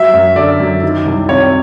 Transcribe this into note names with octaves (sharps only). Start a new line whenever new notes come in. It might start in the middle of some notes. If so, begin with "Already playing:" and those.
Already playing: F#3 E5
F#2
D3 D5
F#2
D#3
C2
C3 C#5